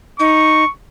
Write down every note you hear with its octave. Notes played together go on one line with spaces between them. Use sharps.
D#4 C#6